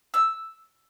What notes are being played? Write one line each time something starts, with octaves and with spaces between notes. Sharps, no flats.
E6